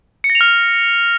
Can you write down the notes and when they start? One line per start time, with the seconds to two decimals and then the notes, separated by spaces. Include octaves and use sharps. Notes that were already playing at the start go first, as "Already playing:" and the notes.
0.24 C#7
0.30 A#6
0.35 F7
0.41 F6